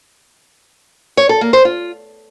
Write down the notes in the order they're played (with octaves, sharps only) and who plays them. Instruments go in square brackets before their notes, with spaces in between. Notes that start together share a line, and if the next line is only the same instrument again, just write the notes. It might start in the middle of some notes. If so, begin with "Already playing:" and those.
[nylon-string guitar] C#5
A4
A#3
C5
F4